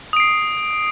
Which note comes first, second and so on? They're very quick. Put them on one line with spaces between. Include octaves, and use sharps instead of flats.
D#6 D7 C7